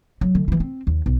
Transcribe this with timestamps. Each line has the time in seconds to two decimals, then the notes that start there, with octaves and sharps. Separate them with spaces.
0.21 F#3
0.35 D3
0.48 E3 E4
0.60 C4
0.87 D#2
1.06 B1